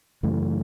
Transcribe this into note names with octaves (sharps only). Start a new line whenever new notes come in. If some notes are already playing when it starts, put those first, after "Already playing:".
F#2 C#3 E3 A3